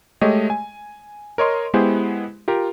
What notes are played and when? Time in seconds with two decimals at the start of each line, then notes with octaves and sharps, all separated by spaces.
0.21 G#3 A3 G4 C#5 D#5
0.50 G#5
1.38 A#4 C#5 D#5 C6
1.74 G#3 B3 E4 G4 G#4 C5
2.48 F4 G4 A#4